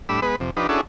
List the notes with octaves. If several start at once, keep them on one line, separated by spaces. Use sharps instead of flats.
A2 G3 D4 B5 E6
G#3 B3 B4
F2 C3
F3 D4 D#4 G4 B4
C#4 D4 E4 F#4 G#4 A4